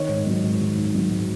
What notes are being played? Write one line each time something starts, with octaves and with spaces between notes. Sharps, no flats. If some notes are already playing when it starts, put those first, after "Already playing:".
Already playing: D#3 C#5
G#2
F#3
G#2
D#3
G#2
F#3
G#2